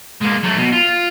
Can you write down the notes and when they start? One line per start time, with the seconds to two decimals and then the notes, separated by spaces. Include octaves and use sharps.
0.21 G#3 A#3
0.43 F#3 A3
0.58 B2
0.72 F4